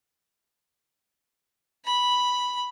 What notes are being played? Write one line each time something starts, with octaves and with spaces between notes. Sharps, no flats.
B5